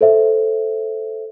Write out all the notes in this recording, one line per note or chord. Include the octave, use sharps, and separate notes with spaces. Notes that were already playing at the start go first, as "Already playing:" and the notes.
A4 C5 E5